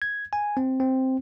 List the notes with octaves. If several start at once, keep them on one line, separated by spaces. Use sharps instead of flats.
G#6
G#5
C4
C4